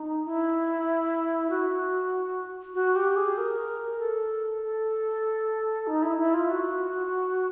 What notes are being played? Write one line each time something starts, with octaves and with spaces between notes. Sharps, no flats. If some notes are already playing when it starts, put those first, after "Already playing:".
Already playing: D#4
E4
F#4
F#4
G4
G#4
A#4
A4
A4
D#4
E4
E4
F4
F#4